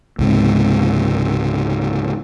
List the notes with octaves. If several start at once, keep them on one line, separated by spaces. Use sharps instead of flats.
C#2 G#2 C3